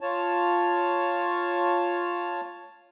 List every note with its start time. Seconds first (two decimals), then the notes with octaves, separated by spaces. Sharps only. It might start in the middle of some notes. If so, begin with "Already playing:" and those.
0.01 F4 C#5 A5